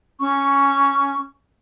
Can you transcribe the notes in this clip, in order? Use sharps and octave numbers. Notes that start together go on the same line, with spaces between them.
C#4 C#6